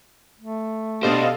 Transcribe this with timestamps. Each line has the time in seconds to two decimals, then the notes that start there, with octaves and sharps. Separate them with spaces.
0.40 A3
1.03 B2 D4 G4 A4 C5 D#5 F5